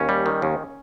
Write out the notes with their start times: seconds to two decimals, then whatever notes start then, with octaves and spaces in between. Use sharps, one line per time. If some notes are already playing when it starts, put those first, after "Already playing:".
Already playing: D#2 C#4
0.09 G3
0.26 D#3
0.42 D#2